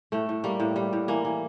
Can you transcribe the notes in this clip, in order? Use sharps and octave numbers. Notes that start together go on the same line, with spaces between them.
A2 A3
A2
G3 A#3
A2
G3
A2
E3 A#3
E3